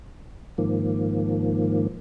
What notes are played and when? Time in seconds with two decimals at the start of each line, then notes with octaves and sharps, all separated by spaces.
0.58 G#2 D#3 F3 A#3